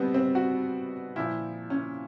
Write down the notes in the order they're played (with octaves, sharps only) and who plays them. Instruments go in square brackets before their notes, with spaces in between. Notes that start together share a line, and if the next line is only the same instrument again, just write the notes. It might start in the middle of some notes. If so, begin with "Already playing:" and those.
Already playing: [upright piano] B2 G3 B3 C4
C4
F#4
A#2 F3 E4
C#4